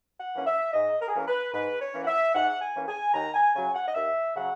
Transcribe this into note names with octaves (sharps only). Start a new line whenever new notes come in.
F#5
E3 A#3 C#4
E5
G#2 D#5
A#4
G#4
E3 A#3 C#4 A#4
B4
G#2 B4
C#5
E3 A#3 C#4
F#5
E5
G#2 F#5
G#5
E3 A#3 C#4
G#5
D#2 A#5
G#5
C#3 F#3 G#5
F#5
D#5
D#2 E5
C#3 F#3 F#5